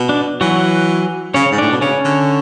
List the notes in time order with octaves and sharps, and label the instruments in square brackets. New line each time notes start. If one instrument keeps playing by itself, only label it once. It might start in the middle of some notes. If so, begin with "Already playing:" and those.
Already playing: [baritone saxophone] B2
[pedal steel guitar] D4
[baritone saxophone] E3 [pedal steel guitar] F#3 F#4
[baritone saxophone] C#3 [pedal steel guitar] C#4 C#5
[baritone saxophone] G#2
[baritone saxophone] A2 [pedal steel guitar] D4 D5
[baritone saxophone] B2
[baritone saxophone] C#3 [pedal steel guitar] C#4 C#5
[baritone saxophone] D3